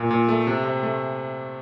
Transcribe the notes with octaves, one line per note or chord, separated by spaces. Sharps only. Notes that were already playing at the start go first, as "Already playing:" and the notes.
Already playing: A#2
A#2
A3
C3
C3
A3